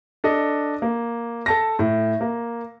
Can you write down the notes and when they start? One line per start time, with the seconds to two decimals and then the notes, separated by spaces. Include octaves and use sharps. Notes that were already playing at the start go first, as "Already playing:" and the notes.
0.24 D4 A4 D5 D#5
0.82 A#3
1.46 A4 A5 A#6
1.79 A2
2.21 A#3